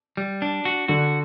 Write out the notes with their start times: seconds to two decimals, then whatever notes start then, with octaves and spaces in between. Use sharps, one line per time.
0.17 G3
0.42 D4
0.65 F#4
0.88 D3 F#4